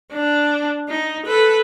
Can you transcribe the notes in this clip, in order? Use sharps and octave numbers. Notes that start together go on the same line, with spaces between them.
D4
D#4
A4 B4